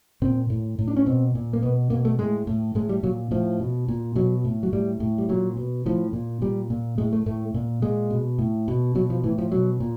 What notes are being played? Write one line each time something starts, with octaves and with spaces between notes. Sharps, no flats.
A#2 C4
A2
A2
D4
C#4
B2 C4
A#2
A#3
B2 B3
B2 A#3
A3
A2 G#3
A2
A2 G#3
G3
A#2 F#3
A2 F3
B2
A#2
B2 F#3
A2
F#3
A2 G3
A2
G3
A#2 F#3
B2
A2 F3
A#2
A#2 G3
A#2
A2 G#3
A3
A2 A3
A#2
A#2 G#3
B2
A2
B2
B2 F#3
F3
A2 E3
F3
B2 F#3
A#2